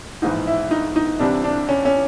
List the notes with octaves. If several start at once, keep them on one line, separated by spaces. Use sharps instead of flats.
A#1 G#2 E3 D#4
E4
D#4
D#4
C2 C3 E3 D4
D4
C#4
C#4